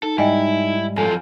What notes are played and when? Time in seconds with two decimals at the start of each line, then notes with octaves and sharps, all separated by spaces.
0.03 D#4 A4
0.18 G#2 G3 E4 D#5 G5 G#5
0.97 F#2 F3 A4 G#5